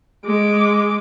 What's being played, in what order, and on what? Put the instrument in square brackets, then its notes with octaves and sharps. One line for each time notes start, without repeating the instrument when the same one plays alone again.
[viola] G#3 D6